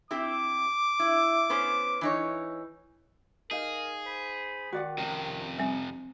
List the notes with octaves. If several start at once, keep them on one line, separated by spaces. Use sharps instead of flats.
C4 E4 G4 D6
E4
B3 C#4 C5
E3 D#4 C#5
D#4 G#4 A#4 F5
C5 G#5 B5
D#3 F#4 D5 F#5
F2 C3 C#4
G3 C4